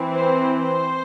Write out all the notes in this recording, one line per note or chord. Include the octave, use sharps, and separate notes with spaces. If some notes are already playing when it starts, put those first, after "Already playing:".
Already playing: E3 C4
C5
C5